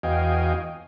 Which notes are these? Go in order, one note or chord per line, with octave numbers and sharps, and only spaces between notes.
E2 F#4 D#5 F5 G5 G#5